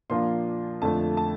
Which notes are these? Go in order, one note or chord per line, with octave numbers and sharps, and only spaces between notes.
A#2 F3 A#3 D4 F4 C6
F2 D3 F3 A3 A5
A5